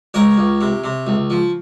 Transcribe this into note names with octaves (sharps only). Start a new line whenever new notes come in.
C#2 A#4 C#5
C#2
C3
C3
C#2
F3